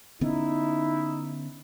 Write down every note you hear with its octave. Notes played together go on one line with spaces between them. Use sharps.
D3 B3 C#4 D#4 E4